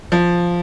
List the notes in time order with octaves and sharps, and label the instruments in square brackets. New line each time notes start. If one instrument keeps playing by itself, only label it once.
[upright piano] F3